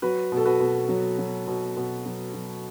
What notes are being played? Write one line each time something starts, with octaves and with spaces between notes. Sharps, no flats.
F#3 F#4 B4
B2
A4
F#4 B4
B2
F#3
F#3
B2
B2
F#3
F#3